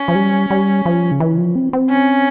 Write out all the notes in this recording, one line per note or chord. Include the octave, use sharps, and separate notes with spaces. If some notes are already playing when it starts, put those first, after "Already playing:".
Already playing: C#4
F3
G3
G3
F3
C#3
E3
F3
C4
C4
C#4